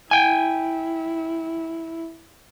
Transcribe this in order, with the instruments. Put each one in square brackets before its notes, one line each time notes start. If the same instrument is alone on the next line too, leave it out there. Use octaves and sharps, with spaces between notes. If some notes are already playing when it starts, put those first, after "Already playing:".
[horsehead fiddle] E4 [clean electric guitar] G5 G#5